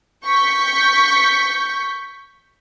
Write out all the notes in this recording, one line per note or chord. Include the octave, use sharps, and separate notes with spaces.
C#6 G6 B6